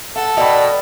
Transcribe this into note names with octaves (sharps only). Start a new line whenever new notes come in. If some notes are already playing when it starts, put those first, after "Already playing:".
A4 F#5
B2 D5 D#5 G5 B5